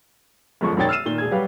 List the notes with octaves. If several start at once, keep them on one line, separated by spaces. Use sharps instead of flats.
G1 F#2 F3 G#3 C#6
E1 F#2 D#3 C#5 G5 A6
E6 F6 C7 D#7 E7
A#2 D#3 G7
E1 G#4 G#6
F#3 G3 G4 B4 F5